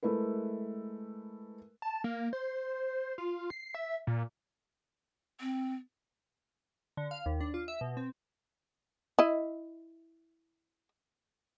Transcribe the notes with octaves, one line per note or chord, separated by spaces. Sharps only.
G#3 A3 E4 A#4 B4
A5
A#3
C5
F4
C7
E5
A#2
C4
D3
F5
D#2
D4
F4
E5
B2
C4
E4 D#5